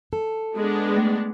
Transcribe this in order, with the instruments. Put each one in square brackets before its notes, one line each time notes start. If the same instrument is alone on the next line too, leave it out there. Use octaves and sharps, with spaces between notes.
[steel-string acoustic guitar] A4
[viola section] G#3 B3 D4
[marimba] A3